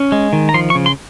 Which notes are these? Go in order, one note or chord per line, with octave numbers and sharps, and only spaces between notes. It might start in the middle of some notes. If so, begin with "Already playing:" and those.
Already playing: C#4
G#3
D#3
A#5
F3 C6
C#6
C#3
C6